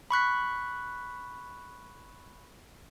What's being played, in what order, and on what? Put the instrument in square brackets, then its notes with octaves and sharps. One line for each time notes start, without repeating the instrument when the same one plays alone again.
[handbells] B5 C#6 F#6 B6